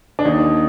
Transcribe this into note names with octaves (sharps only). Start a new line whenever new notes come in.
D4
D#2 D#4